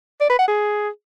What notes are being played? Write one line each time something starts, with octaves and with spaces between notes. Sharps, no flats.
D5
B4
F#5
G#4